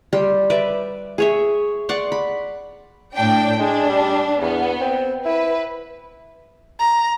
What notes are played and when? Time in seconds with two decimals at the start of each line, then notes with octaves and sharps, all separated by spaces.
0.13 G3 G4 G5 C6
0.50 B4 D5 E5
1.18 G#4 C#5 E5
1.89 D5 F#5 C6 C#6
2.12 B5
3.14 A2 D4 G5
3.59 G#3 D4
3.90 G3
4.42 E2 B3
4.81 C4
5.26 E4 B4
6.79 A#5